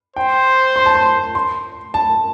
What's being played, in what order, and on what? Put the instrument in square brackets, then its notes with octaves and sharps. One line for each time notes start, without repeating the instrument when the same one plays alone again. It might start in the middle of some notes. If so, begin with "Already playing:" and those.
[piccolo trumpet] C5 [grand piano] G5
[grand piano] C6
A5
C6
C6
A5